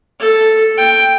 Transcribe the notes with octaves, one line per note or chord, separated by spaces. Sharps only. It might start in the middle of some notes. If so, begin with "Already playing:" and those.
A4
G5